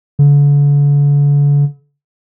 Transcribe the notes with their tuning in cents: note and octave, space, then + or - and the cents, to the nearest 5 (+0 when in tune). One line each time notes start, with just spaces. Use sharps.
D3 -40